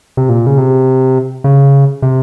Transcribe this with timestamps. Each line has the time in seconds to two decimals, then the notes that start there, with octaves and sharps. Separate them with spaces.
0.17 C3
0.29 A#2
0.47 C#3
0.58 C3
1.44 C#3
2.02 C3